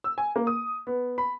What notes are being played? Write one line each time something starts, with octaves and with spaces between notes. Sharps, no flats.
E6
G#5
A#3
D#6
B3
B5